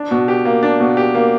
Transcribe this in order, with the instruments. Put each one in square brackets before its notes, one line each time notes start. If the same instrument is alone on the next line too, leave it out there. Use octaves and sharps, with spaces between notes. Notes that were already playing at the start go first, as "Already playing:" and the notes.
Already playing: [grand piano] D4
B2
G4
A#3
D4
B2
G4
A#3